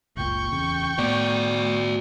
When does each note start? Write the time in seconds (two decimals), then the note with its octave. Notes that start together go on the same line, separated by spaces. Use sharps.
0.17 F#1 C#2 A#2 G5 C#6
0.52 D1 E2 C#3
0.99 A2 B3 F#4 D5